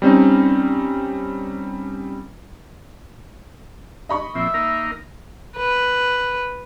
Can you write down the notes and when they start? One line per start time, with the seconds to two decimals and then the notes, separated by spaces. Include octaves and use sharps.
0.02 G3 C4 C#4 D#4
4.09 D#5 B5 C#6
4.35 A#2 F3 C4 E5
4.54 A#3 D#4 A#4
5.56 B4